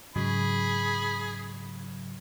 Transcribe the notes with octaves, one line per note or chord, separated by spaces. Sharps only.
G#2 C#3 F#3 G#4 B5